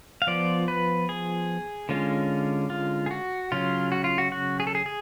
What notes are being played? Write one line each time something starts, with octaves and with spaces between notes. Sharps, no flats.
F5
F3 B3 F4 D5
B4
G#4
D3 G#3 C#4 F4
F4
G#4
F#4
C#3 F#3 C#4 F4
F#4
F4
F#4
F#4
G#4
A4
G#4
G#4